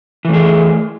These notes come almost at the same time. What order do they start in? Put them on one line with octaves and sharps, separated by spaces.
E3 A3 G#4